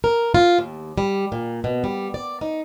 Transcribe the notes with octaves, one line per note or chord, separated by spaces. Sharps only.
A#4
F4
D#2
G3
A#2
B2
G3
D5
D#4